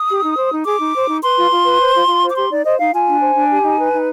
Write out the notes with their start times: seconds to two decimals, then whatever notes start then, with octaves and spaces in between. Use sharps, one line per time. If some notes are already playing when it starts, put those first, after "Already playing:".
Already playing: D#6
0.09 G4
0.23 D#4
0.37 C5
0.51 D#4
0.65 G#4 D6
0.79 D#4
0.94 C5
1.08 D#4
1.22 B4 C6
1.37 F4
1.51 F4
1.64 B4
1.79 C5
1.94 F4
2.07 F4
2.22 C5
2.30 D6
2.35 G4 C6
2.50 D#4 D5
2.65 C5 D#5
2.78 D#4 F5
2.93 F4 G#5
3.08 D4
3.21 C5
3.35 D4
3.50 G4
3.63 D#4
3.78 B4
3.92 D#4